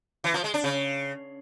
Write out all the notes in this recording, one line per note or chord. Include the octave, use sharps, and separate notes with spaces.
E3
F3
G#3
D4
C#3